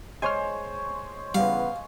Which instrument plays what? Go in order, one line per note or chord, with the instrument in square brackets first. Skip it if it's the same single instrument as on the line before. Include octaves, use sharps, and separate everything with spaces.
[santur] G#3 C5 C#5 [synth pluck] G#5 F6
[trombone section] C#3 E3 B3 [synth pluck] G3 [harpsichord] F5